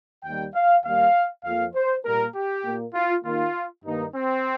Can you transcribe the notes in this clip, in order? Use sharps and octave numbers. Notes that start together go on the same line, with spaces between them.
D#2 D#3 G3 A#3 G5
F5
D#2 D#3 G3 A#3 F5
F2 F3 A#3 F5
C5
A#2 G3 A#3 A#4
G4
A#2 A#3
F4
D#2 D#3 A#3 F4
G2 D#3 A#3 D#4
C4